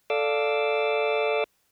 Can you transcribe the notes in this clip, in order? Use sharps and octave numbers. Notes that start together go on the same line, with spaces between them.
A4 D5 F5 D6 E6